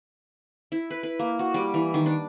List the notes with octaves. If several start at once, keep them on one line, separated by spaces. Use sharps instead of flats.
E4
B4
B4
A#3
F#4
G3
E3
D#3
D4